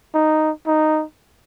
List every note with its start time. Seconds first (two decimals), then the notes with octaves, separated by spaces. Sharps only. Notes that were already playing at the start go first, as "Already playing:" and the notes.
0.14 D#4
0.67 D#4